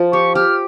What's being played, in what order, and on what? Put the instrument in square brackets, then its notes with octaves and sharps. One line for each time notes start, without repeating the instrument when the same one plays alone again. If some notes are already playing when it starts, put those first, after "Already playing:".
Already playing: [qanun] F3
[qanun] G4 [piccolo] C#6
[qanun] G4 [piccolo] F6